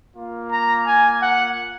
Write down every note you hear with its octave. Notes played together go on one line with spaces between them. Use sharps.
A#3 F4
A#5
G#5
F#5